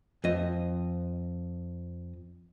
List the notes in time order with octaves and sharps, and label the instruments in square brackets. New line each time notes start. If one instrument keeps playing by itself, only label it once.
[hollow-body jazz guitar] F2 D#5